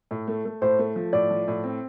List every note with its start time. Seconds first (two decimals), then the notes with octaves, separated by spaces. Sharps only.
0.11 A2
0.28 A3
0.45 A3
0.62 A2 C5
0.79 A3
0.96 F3
1.13 A2 D5
1.30 F3
1.48 A2
1.64 C4